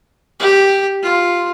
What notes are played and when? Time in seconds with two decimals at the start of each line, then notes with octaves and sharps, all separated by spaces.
0.40 G4
1.03 F4